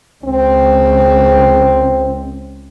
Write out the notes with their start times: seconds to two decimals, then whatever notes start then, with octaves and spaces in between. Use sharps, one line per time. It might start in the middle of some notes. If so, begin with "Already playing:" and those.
0.25 C#2 C4